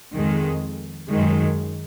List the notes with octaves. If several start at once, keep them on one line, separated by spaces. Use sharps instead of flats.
F2 D#3 G#3
F#2 D#3 G#3